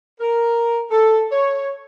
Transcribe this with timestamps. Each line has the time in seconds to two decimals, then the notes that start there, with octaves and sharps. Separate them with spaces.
0.21 A#4
0.91 A4
1.32 C#5